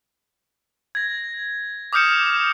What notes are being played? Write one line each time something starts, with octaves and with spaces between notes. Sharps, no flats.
G#6 A#6
D6 D#6 F6 G6 C#7 E7
F6